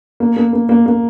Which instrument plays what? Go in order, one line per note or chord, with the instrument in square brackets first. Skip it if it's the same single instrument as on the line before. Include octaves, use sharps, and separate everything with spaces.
[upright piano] A#3
A#3
A#3
A#3
A#3